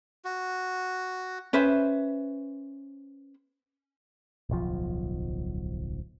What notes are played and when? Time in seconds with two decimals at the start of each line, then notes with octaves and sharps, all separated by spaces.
0.25 F#4
1.53 C#4 B4 C5 E5
4.49 D1 B1 F3